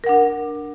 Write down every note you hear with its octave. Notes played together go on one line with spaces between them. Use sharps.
D4 A#4 F#5